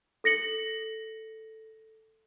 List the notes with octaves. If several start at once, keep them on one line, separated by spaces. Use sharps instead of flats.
A4 A#6 C#7 F#7